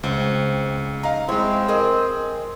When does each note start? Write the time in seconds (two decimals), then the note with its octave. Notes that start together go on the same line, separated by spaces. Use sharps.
0.03 C#2 C4
1.03 D#4 F5 A#5
1.29 G#3 C4 E4 C#5
1.68 G#4 A#4 C5 D#5